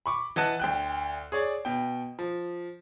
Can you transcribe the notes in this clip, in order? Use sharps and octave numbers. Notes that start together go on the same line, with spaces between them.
B5 C#6 D6
E3 D#5 F#5 A5 F#6
D2 G5 F#6
G#4 C#5 D5
B2 G5
F3